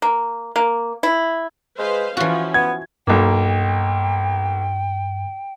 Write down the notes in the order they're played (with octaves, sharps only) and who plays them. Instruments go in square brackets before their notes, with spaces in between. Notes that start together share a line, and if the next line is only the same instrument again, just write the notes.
[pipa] A#3
A#3
E4
[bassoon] G#3 [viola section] B4 C5 F5
[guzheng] E3 F#4 [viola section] F3 C#4 [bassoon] F4
[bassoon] B3 [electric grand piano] G#6
[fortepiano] B1 A#3 [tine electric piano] G2 [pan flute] G5